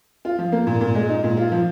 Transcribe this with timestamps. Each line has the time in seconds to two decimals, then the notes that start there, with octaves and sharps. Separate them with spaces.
0.25 F4
0.39 F3
0.52 A#3
0.67 A#2
0.81 A#2
0.95 G#3
1.09 D#4
1.24 A#2
1.37 F4
1.52 F3